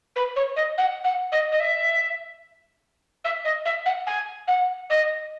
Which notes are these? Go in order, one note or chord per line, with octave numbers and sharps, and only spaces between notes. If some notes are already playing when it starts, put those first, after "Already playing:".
B4
C#5
D#5
F#5
F#5
D#5
D#5
E5
E5
D#5
E5
F#5
G#5
F#5
D#5